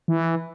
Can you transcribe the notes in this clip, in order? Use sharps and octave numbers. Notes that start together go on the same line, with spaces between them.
E3